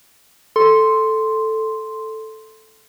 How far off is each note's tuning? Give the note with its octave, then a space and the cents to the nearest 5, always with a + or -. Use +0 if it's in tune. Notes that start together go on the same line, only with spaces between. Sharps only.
A4 +0 C6 +0